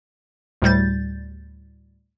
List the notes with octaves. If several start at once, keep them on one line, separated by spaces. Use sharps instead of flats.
D2 A2 G3 G6 A6